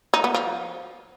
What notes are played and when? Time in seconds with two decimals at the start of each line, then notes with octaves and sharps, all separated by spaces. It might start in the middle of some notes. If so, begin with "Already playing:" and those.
0.14 D#4
0.24 B3
0.34 F3